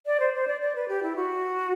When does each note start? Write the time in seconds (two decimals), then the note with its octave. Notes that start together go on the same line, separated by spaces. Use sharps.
0.06 D5
0.20 C5
0.34 C5
0.48 D5
0.61 D5
0.75 B4
0.88 G4
1.03 E4
1.16 F#4